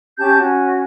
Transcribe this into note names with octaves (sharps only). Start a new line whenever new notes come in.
C#4 G4 A5 G6
C#4 F#4